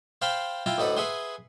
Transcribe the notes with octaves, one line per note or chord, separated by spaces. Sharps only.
C5 F5 G5 A5 B5 C6
E4 F4 G5 A5 A#5
D2 A2 D#4 A4 B4 F#5
G#4 B4 E5 F#5 G#5 C6